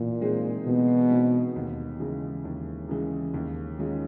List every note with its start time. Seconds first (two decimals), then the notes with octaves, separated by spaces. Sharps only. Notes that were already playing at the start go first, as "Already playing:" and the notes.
Already playing: A#2 E3
0.21 G#3 C4 D#4 G#4
0.66 B2 E3
1.10 G#3 C4 D#4 G#4
1.56 D#2
2.00 C#3 E3 G#3
2.45 D#2
2.89 C#3 E3 G#3
3.34 D#2
3.78 D#3 G#3 C#4 F4